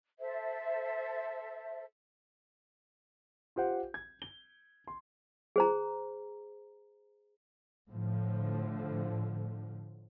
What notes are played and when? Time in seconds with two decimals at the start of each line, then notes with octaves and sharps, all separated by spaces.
0.19 A4 C5 E5
3.56 F4 G4 C5 F#5
3.94 G#6
4.22 G7
4.87 C6
5.56 G#4 C5 A#5
7.90 A2 D3 F3